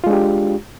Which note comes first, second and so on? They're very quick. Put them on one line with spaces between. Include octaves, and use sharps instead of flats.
F4 G#3 D4 G4